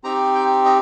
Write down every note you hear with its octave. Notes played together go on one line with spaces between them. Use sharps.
C4 D#4 G4 A#5
G5
D#5